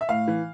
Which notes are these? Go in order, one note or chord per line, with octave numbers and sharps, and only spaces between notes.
E5
A2 F5
E3